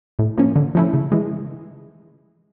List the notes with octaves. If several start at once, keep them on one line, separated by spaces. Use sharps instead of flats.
A2
F3 A#3 C#4
D3
F3 A3 C#4 E4
C#3
E3 G#3